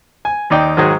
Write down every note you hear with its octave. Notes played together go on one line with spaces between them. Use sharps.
G#5
D#2 D#4 D5 G5
G#2 D#3 F#3 G#3